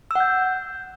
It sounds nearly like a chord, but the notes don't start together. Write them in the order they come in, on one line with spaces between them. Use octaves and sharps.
E6 F#5 G6